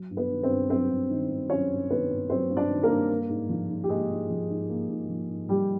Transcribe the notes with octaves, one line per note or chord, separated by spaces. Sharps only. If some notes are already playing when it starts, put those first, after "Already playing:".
Already playing: F#3
G2
B3 B4
D#3
C4 C5
G2
F#3 C4 C5
G2
D#3
G2
F#3 C#4 C#5
G2
D#3 B3 B4
G2
F#3 C4 C5
G2
D4 D5
D#3
A#3 A#4
G2
A#3
G#2
F3
G#2
G4
G#3 A#3 G#4
G#2
F3
G#2
A#3
G#2
F3
G#2
G3 A#3 G4